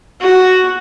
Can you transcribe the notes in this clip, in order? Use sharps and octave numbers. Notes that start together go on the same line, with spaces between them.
F#4